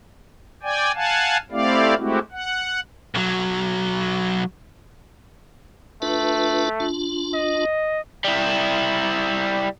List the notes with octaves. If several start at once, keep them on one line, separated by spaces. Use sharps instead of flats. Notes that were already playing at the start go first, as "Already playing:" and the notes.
D5 G5 G#5
F5 F#5 G#5 A5
A3 C4 E4 G4 D5 F5
G#3 A3 C4 E4 F#4 G4
F#5
B1 F#3
A3 D4 F4 B4
D4 F4
D#5
G3 E4